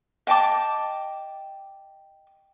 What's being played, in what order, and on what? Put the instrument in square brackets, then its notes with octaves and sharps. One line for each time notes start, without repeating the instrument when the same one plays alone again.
[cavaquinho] D#5 G5 A5 D6